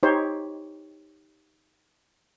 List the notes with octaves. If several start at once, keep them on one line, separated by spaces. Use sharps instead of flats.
D#4 G4 C5 C#5